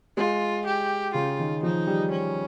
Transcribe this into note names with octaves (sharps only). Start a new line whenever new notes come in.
G#3 F4
G4
C#3 F4
D#3
F3 D#4
G3
C#4